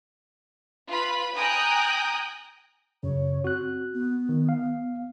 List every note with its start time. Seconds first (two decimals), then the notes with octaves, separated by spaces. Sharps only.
0.89 F4 B4 B5
1.36 G5 G#5 A#5 D#6 F#6 A#6
3.03 F#2 C#3 C#5
3.44 C4 F#4 F#6
3.93 B3
4.29 D#3
4.49 F5